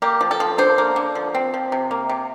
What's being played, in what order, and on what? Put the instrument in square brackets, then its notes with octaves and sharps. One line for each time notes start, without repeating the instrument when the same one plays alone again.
[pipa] A#3 G4
F3
A4
F3
D3 C5
A#3
D3
F3
C4
F3
C3
A#3
C3